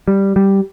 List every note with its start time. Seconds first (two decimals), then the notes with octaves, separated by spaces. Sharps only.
0.08 G3
0.36 G3